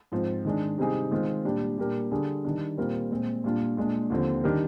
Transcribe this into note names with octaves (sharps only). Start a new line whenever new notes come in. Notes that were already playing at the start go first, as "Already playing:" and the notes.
G#2 F3 C4
D#3 G#3 D4
C3 G3 C4 D#4 G#4
D#3 G#3 C4 F4
A#2 G3 D4 G4
A#2 G3 D4 G4 A#4
D3 G3 D4 G#4
D#3 G3 D4
A#2 G3 C4 F4 A#4
A#2 G#3 C4
A#2 G3 D4 F4
A#2 G#3 D4
D#2 D3 F3 C4
D#3 G3 D4 G4 A#4